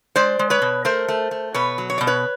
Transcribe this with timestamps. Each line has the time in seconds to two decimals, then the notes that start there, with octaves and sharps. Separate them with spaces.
0.16 G#3 C5 D5
0.39 G#3
0.50 B4 C#5
0.62 B2
0.85 A3 A#4 C5
1.08 A3
1.31 A3
1.54 B2 B4 C#5
1.78 F#3
1.90 C#5
1.98 B2 D5
2.07 B4 C#5